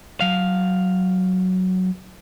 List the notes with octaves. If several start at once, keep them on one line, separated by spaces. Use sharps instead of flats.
F#3 F5